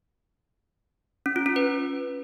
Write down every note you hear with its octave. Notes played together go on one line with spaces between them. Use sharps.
C#4
F4
C#4
B4